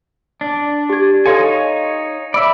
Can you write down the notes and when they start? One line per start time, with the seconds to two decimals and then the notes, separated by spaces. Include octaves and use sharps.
0.41 D4
0.89 G4 G#6
1.26 D#4 A4 C#5 F5 G#5 C6
2.34 D5 E5 B5 E6